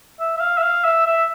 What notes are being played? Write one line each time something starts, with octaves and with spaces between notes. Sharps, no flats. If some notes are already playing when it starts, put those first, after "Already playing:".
E5
E5
F5
E5
F5
E5
E5